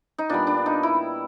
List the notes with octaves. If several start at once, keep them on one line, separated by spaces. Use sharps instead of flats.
D#4
A#2 G3 B3 D4
D4
D#4
E4